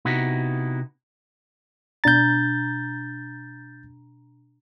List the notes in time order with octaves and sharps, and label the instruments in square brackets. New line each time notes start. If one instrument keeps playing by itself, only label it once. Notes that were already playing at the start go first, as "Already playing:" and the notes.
[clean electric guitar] C3 B3 D#4 E4 F#4
[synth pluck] B2 D4 A#5 [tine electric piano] G6 A6